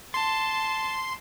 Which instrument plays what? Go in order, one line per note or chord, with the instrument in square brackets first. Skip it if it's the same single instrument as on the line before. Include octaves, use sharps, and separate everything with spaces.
[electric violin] A5 [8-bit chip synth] C6